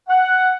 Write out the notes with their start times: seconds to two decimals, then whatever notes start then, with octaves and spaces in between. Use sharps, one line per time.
0.09 F#5